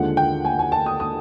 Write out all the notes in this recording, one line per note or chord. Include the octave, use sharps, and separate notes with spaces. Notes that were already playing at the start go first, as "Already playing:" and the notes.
Already playing: D#2 D3 F3 G#3 F#5
G5
G#5
G#5
A5
D#6
D#6